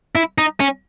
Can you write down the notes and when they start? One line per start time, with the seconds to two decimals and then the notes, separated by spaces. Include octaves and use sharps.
0.15 E4
0.38 D#4
0.60 C#4